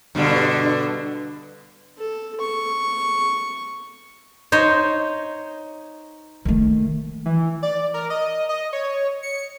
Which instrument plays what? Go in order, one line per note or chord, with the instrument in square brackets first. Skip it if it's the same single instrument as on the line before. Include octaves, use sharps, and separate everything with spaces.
[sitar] G2 B2 D3
[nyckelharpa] A4
C#6
[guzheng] D#4 C5 C#5
[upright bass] D#3 A3
[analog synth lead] E3
D5
A#4
D#5
D#5
C#5
C#7